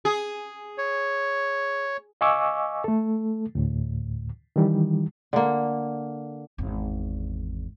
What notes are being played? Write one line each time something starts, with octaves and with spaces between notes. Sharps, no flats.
G#4
C#5
D#5 F5 G#5 C#6 D6 E6
A3 A4
D2 A2
D#3 E3 G3
D3 A#3
G#1 E2